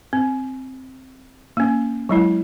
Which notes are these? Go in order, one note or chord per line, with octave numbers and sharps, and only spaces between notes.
C4
A#3 C#4
F#3 G#3 E4